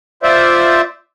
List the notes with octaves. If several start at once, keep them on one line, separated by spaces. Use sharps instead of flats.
F4 C5 D5 E5